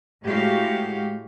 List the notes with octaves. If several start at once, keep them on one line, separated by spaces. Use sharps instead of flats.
A2 G#3 A3 F#4 G4 F5